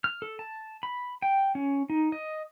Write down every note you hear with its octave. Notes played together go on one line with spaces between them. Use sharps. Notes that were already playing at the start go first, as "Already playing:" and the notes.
F6
A4
A5
B5
G5
C#4
D#4
D#5